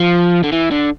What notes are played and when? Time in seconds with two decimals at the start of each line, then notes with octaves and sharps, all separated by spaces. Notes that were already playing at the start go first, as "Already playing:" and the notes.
Already playing: F3
0.43 D3
0.52 E3
0.71 D3